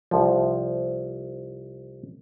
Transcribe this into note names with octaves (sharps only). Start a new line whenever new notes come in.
C2 F3